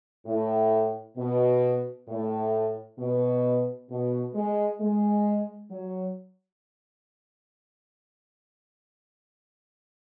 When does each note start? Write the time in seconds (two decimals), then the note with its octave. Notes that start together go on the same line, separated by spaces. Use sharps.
0.26 A2
1.17 B2
2.08 A2
2.99 B2
3.89 B2
4.34 G#3
4.81 G#3
5.71 F#3